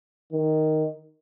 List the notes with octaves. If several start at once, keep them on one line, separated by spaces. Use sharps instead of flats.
D#3